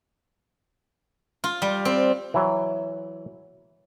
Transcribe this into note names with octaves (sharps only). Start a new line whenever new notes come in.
F4
G3
C4
E3 F#3